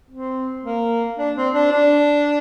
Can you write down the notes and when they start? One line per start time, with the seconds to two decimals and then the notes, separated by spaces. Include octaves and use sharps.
0.10 C4
0.64 A#3
1.18 D4
1.36 C4
1.54 D4
1.71 D4